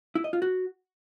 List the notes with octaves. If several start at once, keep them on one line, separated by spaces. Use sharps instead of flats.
E4
D#5
F4
F#4